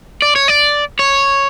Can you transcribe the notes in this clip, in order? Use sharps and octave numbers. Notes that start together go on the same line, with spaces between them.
D5
C#5
D5
C#5